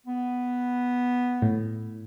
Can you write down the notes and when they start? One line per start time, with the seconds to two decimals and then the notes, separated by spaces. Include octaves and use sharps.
0.07 B3
1.42 A2